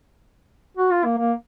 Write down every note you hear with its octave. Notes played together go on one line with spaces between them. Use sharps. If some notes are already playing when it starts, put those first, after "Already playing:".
F#4
F4
A#3
A#3